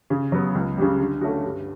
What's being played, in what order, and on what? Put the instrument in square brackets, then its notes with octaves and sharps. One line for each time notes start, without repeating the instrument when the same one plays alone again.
[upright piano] C#3
F#3 B3
C#2
C#3 G3
D3
A3 C#4 F#4
G2